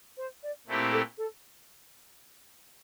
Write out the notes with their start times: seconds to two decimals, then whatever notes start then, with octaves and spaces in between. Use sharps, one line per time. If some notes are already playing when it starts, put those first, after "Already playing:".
0.16 C5
0.43 D5
0.67 A#2 A3 C4 E4 G4
0.92 A4
1.18 A4